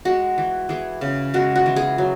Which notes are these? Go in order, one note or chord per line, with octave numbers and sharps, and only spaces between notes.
G#3 F#4
E3
E3 G#4
C#3
G#3 F#4
F#4
E3
G#4
F#3